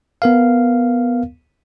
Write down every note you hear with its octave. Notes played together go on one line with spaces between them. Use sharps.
B3 A#4 F5